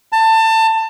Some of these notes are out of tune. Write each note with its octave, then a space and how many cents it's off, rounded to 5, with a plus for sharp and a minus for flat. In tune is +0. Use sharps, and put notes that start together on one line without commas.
A5 +25